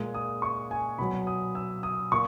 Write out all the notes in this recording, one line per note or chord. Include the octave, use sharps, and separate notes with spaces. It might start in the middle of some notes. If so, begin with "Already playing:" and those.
Already playing: A#2 G#3
D#6
C#6
G#5
B2 F#3 B5
D#6
E6
D#6
A#2 C#6